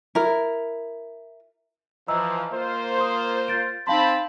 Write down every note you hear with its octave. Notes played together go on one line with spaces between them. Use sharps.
E4 A#4
E3 F3 D#5 A#5 E6
A#3 F4 C5
C6 D#6
G6 A6 D7
C4 D#4 F5 A5 B5 C6